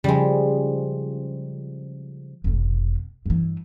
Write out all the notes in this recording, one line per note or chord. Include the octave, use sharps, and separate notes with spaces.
C#3 F3 G3 G#3
F1 B1
G2 E3